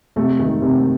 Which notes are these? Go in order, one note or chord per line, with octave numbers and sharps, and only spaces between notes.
C3 A3
D#3
C3